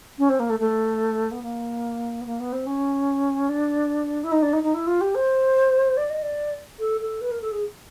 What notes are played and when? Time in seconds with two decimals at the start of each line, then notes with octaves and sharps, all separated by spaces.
0.19 C#4
0.29 C4
0.40 A#3
0.50 A3
0.60 A3
1.31 B3
1.43 A#3
2.21 B3
2.26 A#3
2.40 B3
2.53 C4
2.66 C#4
3.49 D4
4.24 E4
4.32 D#4
4.42 D4
4.53 D#4
4.63 D#4
4.74 E4
4.87 F4
5.01 G4
5.15 C5
5.97 D5
6.10 D#5
6.22 D5
6.79 A4
7.01 A4
7.21 B4
7.31 A#4
7.42 A4
7.52 G#4